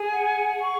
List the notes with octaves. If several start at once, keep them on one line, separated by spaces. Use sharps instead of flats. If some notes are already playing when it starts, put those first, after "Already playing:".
Already playing: G#4 G#5
F#5
C#6